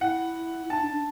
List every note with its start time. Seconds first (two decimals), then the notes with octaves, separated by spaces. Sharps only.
0.01 E4 F#5
0.70 D#4 A5
0.82 D4
0.93 D4